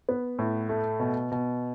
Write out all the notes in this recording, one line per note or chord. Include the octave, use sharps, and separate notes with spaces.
B3
A2
A3
B2
B2